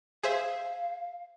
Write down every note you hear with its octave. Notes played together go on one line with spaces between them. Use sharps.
G#4 C5 E5 F5